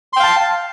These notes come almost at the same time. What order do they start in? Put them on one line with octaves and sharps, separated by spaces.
C6 G5 F5 A5